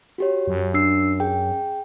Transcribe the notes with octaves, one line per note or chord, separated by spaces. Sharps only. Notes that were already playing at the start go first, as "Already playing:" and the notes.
F#4 G4 C#5
F#2
D4 E6 C7
G#4 G5